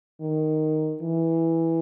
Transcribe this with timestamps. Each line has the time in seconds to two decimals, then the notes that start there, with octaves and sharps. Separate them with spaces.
0.21 D#3
1.01 E3